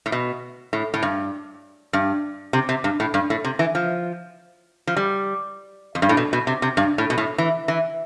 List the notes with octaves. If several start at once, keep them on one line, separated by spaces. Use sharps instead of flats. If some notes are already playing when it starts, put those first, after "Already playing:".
A2
B2
A2
A2
G2
G2
C3
C3
G2
A2
G2
A2
C3
E3
F3
F3
G3
F2
G2
A2
B2
B2
C3
C3
G2
A2
B2
A2
E3
E3